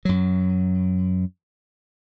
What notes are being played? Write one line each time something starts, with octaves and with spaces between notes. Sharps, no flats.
F#2 F#3